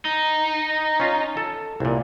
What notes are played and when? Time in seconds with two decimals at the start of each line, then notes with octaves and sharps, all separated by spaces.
0.05 D#4
1.00 C#4 F4
1.37 A4
1.80 C2 A#2